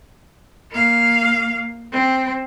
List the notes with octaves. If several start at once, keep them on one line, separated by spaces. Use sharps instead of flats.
A#3 F5
C4